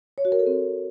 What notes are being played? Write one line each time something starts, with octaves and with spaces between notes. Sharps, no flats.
C#5
F#4
A#4
A4
C4